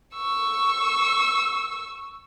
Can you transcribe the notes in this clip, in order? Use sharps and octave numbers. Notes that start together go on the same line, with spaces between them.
C#6 E6